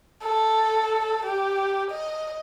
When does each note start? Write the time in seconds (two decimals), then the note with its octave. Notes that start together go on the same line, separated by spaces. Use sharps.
0.23 A4
1.26 G4
1.91 D#5